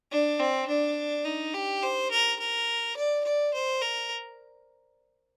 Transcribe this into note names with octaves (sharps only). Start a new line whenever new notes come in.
D4
C4
D4
D#4
G4
C5
A#4
A#4
D5
D5
C5
A#4